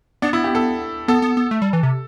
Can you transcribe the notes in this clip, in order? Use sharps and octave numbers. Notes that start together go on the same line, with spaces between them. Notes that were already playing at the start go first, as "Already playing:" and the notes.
B3 D4
E4
G4
A4
B3 A4
B3
B3
A3
G3
E3
C3